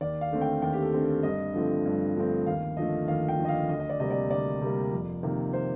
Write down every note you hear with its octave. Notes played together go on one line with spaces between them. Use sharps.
D#2 D5
F5
D3 A3 C4
G5
D#2 G5
G4
A4
D3 A3 C4
G2 D#5
D3 F3 A3 C4
G2
D3 F3 A3 C4
D#2 F5
D3 F3 A3 D#5
D#2 F5
G5
D3 F3 A3
D#5
F5
D2 D#5
D#5
D5
C3 G3 A#3 D#5
D5
D2 D5
C3 G3 A#3
F2
C3 D#3 A#3
C5